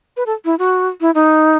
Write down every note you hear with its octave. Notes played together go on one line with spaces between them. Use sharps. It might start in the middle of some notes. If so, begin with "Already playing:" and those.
B4
A4
E4
F#4
E4
D#4